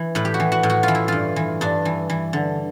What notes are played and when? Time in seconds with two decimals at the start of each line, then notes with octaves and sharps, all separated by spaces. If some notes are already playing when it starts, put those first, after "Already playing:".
Already playing: E3
0.15 A2 B4
0.25 G4
0.34 F#4
0.40 E3
0.52 F#4
0.63 A2
0.70 F#4
0.83 F4
0.88 E3
0.95 E4
1.08 G2 F4
1.36 E3
1.61 G2 D4
1.85 E3
2.10 E3
2.33 D3